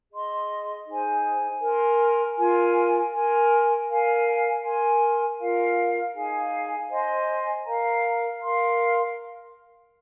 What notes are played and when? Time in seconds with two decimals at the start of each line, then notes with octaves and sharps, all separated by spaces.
0.11 G#4 D#5 C6
0.87 D#4 G#4 C5 G#5
1.62 A#4 G#5 C6
2.38 F4 A#4 G#5
3.14 A#4 G#5 C6
3.89 A#4 F5 G#5
4.64 A#4 G#5 C6
5.39 F4 A#4 F5
6.15 D#4 G#4 F5 G#5
6.90 C5 D#5 G#5 C6
7.66 A#4 F5 A#5
8.41 A#4 F5 C6